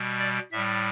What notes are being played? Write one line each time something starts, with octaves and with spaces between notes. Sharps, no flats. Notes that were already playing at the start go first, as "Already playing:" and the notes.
Already playing: B2 G3
D5
A2 G3 E5